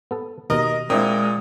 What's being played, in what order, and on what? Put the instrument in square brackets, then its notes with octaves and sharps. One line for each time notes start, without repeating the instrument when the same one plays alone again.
[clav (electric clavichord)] B3 A4
[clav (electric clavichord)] D#2 B2 [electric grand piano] A#4 [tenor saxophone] D#5
[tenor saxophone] A#2 [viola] G#3 [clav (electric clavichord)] C4 D4 E4 [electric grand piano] A#4 G5 D#6